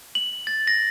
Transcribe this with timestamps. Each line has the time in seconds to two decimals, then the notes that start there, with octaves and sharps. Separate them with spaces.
0.15 F#7
0.47 A6
0.67 A#6